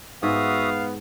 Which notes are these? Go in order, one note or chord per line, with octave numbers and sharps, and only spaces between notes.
G#2 B3 F#4 E5 F5 D#6